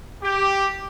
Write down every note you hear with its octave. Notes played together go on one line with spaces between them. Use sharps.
G4